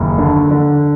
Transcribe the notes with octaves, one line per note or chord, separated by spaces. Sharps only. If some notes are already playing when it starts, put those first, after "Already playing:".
Already playing: F#1 D#2
D3
D3